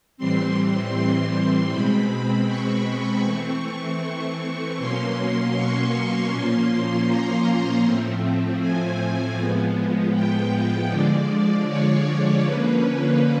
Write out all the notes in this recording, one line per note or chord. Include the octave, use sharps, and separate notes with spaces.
A2 E3 G3 C4 C6
B2 G#3 C4 B5
C#6
E3 A3 C4 C#6
B2 F#3 A#3 C#4 C6
C#6
A#2 F3 A#3 C#4 C6
A#5
A2 F3 A3 C4
G#5
A2 F3 G#3 B3
G5
D3 F3 G#3 D5
C#5
D3 F3 A#3 C#4 B4